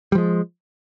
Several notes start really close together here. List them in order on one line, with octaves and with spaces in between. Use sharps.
G3 F3 G#3